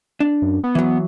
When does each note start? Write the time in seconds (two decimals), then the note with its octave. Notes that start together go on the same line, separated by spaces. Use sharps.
0.20 D4
0.42 F#2
0.64 B3
0.75 E3 F#3